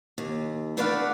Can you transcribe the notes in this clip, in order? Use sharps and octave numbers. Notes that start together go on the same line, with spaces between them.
D#2
A3 D4 B4 D5 F5 F#5